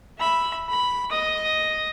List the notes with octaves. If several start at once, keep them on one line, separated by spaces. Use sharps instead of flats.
E5 B5
B5
D#5 D#6